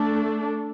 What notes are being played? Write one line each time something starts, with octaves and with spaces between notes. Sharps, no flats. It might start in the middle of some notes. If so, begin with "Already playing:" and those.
Already playing: A3 D4 A4